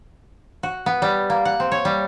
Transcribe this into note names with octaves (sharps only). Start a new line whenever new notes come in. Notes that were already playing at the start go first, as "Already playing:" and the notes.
F#4
B3
G3
A#3
F#5
C4
C#5
G3